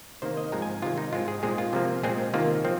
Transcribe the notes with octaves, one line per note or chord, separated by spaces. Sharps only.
C3 D#3 A#3 C5
D#5
G#2 F3 G#3 C4 A#5
G#5
C3 D#3 G#3 F4
D#4
G#2 G#3 C4 F4
G#4
A#2 G#3 C4 G#4
F4
C3 F3 A#3
A#2 G#3 C4 G#4
C3 D#3 A#3 F4
F3 C4